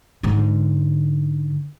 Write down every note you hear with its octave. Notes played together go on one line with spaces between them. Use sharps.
G#2 D3